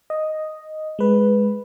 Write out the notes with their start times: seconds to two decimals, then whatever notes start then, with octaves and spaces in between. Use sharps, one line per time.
0.10 D#5
0.99 G#3 B4